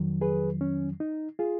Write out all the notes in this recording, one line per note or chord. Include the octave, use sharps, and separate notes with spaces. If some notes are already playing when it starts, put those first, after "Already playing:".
Already playing: F2 D#3 F#3
G#4 B4
C#4
D#4
F4 G#4